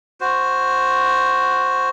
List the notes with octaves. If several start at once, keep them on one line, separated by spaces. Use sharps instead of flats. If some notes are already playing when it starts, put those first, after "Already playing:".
F#4 C5